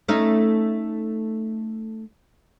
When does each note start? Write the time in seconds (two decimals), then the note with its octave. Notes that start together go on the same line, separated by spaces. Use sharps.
0.08 A3 C#4 D#4